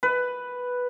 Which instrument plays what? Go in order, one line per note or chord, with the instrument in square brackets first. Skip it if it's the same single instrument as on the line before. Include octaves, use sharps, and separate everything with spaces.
[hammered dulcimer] B4